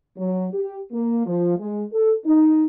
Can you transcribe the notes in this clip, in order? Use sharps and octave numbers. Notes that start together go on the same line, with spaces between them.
F#3
G4
A#3
F3
G#3
A4
D#4